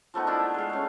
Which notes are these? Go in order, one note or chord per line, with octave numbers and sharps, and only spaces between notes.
F3 A3 B3 D#4
D4 E4 F4
G#3 F5
A3 C#4